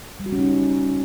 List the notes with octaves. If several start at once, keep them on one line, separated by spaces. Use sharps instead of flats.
G3
F#4
C#4
D#4